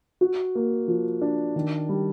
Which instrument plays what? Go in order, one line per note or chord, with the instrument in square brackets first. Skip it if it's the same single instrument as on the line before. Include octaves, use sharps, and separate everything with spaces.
[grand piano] F#4
A#3
F3
D4
D#3
G3